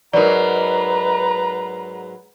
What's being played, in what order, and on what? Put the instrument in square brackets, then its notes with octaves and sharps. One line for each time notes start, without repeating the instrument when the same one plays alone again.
[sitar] G#2 F#3 [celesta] A#4 D5 [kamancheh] B4 A#5